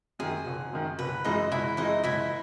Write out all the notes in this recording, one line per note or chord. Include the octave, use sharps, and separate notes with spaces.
F#2 D#3 G#4
F#1
F#2 D#3
F#1 B4
F#2 E3 G#3 D#4 D#5
F#1 E4 E5
F#2 E3 G#3 D#4 D#5
F#1 E4 E5